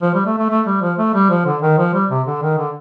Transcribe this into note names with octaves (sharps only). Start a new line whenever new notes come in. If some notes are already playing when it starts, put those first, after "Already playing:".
F3
G3
A3
A3
A3
G3
F3
A3
G3
F3
D3
D#3
F3
G3
C3
D3
D#3
D3